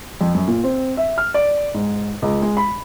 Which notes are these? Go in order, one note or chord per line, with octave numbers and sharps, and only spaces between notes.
F2
F#2
A#2
C4
E5
F6
D5
G#2
C#2
G#3
B5